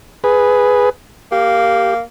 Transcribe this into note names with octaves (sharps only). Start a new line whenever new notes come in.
G#4 B4
A#3 G4